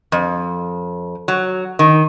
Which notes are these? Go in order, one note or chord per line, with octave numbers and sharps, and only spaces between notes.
F2
F#3
D#3